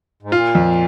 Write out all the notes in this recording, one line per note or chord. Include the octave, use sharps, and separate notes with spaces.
G#2
A#2 F4
F2